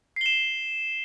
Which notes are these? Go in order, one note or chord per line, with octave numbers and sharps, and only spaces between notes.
C7 E7 G7